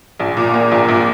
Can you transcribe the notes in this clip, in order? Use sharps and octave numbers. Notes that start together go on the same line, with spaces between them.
A#1
A#2
A#3
A#1
A#1